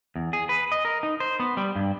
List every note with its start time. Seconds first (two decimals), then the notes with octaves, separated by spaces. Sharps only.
0.16 E2
0.33 G#4
0.49 B4
0.72 D#5
0.85 A#4
1.03 D#4
1.20 C5
1.40 B3
1.57 G3
1.76 G2